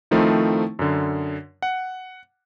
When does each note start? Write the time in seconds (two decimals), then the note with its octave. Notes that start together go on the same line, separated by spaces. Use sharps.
0.11 D#3 F3 A3 C4 D#4 E4
0.79 F#2 D3
1.62 F#5